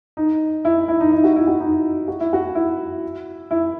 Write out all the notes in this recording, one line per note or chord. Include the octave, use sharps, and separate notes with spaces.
D#4
E4
E4
D#4
D#4
F#4
E4
F#4
D#4
F#4
E4
F#4
E4
E4